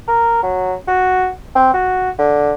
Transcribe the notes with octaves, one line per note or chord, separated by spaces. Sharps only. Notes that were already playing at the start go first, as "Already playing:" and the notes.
A#4
F#3
F#4
C4
F#4
D3